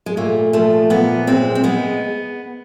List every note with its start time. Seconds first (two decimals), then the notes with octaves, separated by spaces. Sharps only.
0.06 G#3
0.17 A#2 A3
0.53 F3 A3
0.90 A#2 B3
1.27 G#3 C4
1.55 C4
1.64 G#3 B3